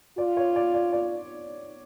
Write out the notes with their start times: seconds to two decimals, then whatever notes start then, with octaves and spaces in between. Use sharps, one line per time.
0.18 F4 D5
0.37 C#5
0.56 D5
0.74 D5
0.93 D5